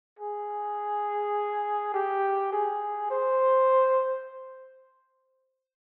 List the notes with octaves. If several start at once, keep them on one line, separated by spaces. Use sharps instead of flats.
G#4
G4
G#4
C5